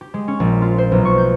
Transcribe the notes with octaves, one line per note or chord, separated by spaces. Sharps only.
G4
G#3
C#4
A#1
F4
C5
B1
C#6
G6